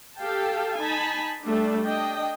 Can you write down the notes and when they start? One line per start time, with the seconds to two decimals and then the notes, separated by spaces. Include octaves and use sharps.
0.19 G4 A4 F5 G5 A5
0.78 D#4 G#5 A5 B5
1.45 G3 A3 D4
1.84 D4 D#5 G5